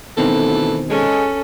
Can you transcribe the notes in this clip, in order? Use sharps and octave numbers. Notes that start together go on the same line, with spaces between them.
D2 B2 D#3 E3 C4 A4
G#3 C#4 A4